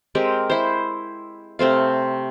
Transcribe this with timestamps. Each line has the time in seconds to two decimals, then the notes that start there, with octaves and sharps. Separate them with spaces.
0.15 G#3 C4 G4 A#4
0.50 E4 C5
1.59 C3 A3 C4 F5